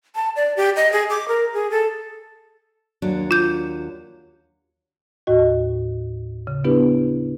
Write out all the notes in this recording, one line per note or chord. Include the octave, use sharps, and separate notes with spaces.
A5
D5
G4
D#5
G#4
D6
A#4
G#4
A4
D#2 F#3 D4
F4 G6
D#2 A2 F#4 D#5
C#3
B3 D4 E4 G4 B4